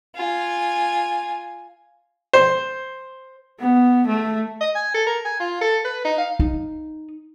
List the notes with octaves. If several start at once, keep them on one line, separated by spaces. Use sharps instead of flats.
F4 G#5
C5
B3
A3
D#5
G#5
A4
A#4
G#5
F4
A4
B4
D#4
F5
D#4